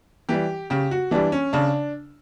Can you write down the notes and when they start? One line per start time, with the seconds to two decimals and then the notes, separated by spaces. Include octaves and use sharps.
0.29 E3 G3 G4
0.70 C#3 G4
0.91 F#4
1.11 E3 G3 D4
1.32 C#4
1.53 C#3 D4